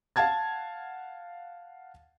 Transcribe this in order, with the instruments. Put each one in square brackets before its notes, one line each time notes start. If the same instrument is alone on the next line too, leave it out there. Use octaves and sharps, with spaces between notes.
[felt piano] F5 F#5 A5 G#6 A6